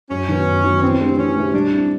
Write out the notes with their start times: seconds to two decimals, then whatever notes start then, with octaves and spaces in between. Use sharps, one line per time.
0.10 F#2 C#4
0.29 D#3 F#3 B3
0.46 F#2
0.64 D#3 F#3 B3
0.82 E3 C4
1.00 A3 D4 G4 C5
1.18 E3 C#4
1.36 A3 D4 G4 C5
1.53 G3 D4
1.71 C4 E4